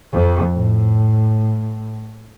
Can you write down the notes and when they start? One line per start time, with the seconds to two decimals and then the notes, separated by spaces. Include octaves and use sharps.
0.15 F2
0.54 A2